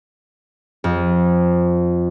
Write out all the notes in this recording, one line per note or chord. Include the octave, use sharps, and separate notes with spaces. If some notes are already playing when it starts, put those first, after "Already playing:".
F2